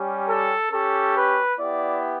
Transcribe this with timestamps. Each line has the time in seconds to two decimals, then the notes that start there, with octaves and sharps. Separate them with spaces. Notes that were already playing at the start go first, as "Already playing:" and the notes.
Already playing: G3 C#4 G4
0.28 A4
0.72 C#4 G4 A4
1.16 B4
1.59 B3 E4 G4 D5